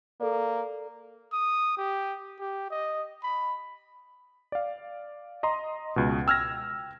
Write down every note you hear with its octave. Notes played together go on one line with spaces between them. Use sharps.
A#3 A4 D5
D#6
G4
G4
D#5
B5
D5 F5
D#5 A#5 C6
C#2 B2
G5 E6 F6 G#6 A#6